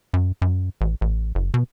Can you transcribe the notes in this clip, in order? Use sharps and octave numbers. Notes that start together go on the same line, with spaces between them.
F#2
F#2
A1
A1
F#1
B2